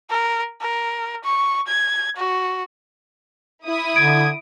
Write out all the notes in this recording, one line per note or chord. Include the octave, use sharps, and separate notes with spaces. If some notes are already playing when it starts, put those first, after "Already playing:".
A#4
A#4
C#6
G#6
F#4
E4 D#6
D3 G#6 D7